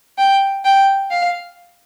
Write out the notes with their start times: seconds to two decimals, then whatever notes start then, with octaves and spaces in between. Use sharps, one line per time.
0.18 G5
0.65 G5
1.11 F5